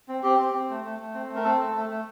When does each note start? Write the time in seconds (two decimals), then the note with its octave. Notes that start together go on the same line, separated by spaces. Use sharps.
0.08 C4
0.23 C4 G4
0.39 C4
0.54 C4
0.69 A3
0.84 A3
0.99 A3
1.14 C4
1.29 A3
1.35 A#4
1.44 C4 A4
1.60 A3
1.75 A3
1.89 A3